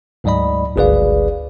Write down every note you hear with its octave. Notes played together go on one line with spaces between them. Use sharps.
D2 G#2 F#3 D5 D#5 B5
G1 C#2 G#4 B4 D5 F5